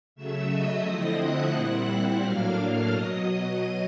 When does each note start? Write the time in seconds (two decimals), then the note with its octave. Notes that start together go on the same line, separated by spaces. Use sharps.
0.15 C#3 F#3 A3 E5 E6
0.50 D#5 D#6
0.84 D3 F3 A3 C4 E4 D#5 D#6
1.19 F#5 F#6
1.53 A#2 G3 C4 E4 F#5 F#6
2.21 A2 F#3 A#3 D4 F5 F6
2.90 B2 F#3 D#5 D#6